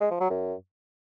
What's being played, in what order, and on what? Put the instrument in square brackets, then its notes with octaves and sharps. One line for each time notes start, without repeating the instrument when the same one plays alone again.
[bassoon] G#3
F3
F#3
F#2